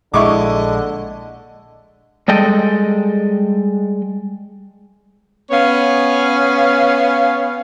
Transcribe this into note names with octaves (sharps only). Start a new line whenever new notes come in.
A#1 A#2 D3 G#3 E4 D#5 C#6 D6
G3 G#3 A4 D#5 G5
B3 C#4 C#5 F5